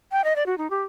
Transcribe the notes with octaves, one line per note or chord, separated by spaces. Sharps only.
G5
D#5
D5
F#4
D#4
G4